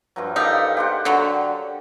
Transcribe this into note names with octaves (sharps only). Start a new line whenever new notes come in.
G2 F3 F#3
D#4 G4 A4 A#4
G4 C5 F#5
D3 F#3